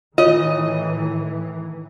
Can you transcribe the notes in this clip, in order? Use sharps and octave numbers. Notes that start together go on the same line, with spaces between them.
A2 D#3 E3 F4 C#5 D#5